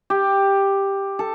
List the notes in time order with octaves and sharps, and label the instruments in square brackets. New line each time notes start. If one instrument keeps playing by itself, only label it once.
[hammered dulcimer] G4
A4